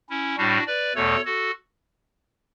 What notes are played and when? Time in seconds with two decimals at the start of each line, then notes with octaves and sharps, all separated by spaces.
0.10 C#4 E4
0.37 A2 G3 D4 F#4
0.66 B4 D5
0.95 E2 B2 A3 A4 C#5
1.25 F#4 A4